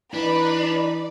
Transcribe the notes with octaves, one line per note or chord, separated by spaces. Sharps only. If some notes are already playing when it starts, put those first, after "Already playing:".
E3 D4 D#4 B4 D5 B5